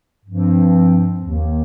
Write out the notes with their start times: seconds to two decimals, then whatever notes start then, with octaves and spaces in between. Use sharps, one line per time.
0.25 G2 F3 C4
1.20 D#2 D#3 A#3